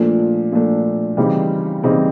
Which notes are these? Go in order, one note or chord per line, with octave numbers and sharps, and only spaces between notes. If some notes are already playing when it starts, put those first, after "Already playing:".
Already playing: A#2 F3 A3 D4
A#2 F3 A3 D4
C#3 E3 G3 C4 D#4
C#3 E3 G3 C4 D#4